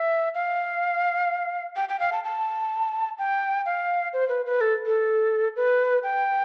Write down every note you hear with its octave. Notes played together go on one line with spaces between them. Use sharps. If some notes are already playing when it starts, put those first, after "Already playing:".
Already playing: E5
F5
G5
G5
F5
A5
A5
G5
F5
C5
B4
B4
A4
A4
B4
G5